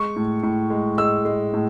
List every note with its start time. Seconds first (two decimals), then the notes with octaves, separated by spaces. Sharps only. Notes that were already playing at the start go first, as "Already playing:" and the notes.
Already playing: G#3 C#6
0.16 A2
0.43 A2
0.70 G#3
0.97 G#3 E6
1.25 G#3
1.53 A2